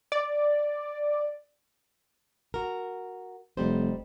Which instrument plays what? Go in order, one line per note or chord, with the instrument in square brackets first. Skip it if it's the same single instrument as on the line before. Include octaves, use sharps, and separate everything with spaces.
[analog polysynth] D5
[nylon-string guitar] F#4 A#4
[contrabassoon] F1 [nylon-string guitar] G3 D#4 C5